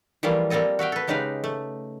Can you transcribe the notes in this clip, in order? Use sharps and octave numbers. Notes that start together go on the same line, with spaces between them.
E3 F3 G3 A3 A#3 F4
G3 A#3 C4 A4 D#5
F#4 E5 F5 G5
A4 B4
C#3 G#3 D#4 G4 B4 F5
A3